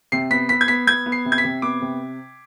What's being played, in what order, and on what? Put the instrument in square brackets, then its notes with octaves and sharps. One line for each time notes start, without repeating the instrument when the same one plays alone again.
[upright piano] C3 C7
B3 B6
B3 B6
G#6
B3 B6
B3 G#6
B3
C7
C3
G#6
B6
C3
B3 D6
C3